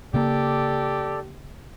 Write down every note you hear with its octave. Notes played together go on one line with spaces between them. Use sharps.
C#3 A#3 G4 A4 D5